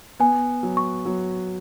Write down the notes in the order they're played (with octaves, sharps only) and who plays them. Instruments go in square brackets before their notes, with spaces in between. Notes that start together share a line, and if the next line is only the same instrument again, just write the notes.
[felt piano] B3 [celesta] G#5
[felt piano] F#3
[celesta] C#6
[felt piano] F#3